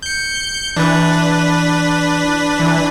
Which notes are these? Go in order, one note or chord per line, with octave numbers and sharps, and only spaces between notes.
G6 C#7
E3 D4 B4
E3